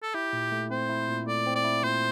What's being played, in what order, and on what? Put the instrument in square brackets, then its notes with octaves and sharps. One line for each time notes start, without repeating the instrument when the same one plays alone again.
[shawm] A4
[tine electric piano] E4 [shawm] G4
[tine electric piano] A#2
A3
[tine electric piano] C4 [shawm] C5
[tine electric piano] E4
A#2
[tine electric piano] A3 [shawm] D5
[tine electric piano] C4
[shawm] D5
[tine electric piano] E4
[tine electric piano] A#2 [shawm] C5